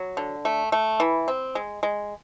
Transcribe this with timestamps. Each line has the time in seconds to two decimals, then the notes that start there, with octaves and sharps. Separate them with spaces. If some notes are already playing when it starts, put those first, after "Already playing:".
Already playing: F#3
0.17 D3
0.45 A3
0.72 A3
1.00 E3
1.28 C4
1.55 G#3
1.83 G#3